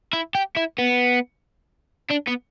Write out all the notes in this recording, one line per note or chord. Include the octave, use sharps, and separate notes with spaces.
E4
G4
E4
B3
D4
B3